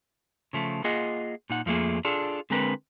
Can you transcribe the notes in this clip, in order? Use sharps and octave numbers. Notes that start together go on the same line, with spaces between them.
C#3 F3 A3
A#3 F4 G#4 D#5 F#5
A#2 D#4 F#5
F2 F3 A3 A#3 G#4
D4 F4 G#4 A4
D3 G#3 C4 A#4 B4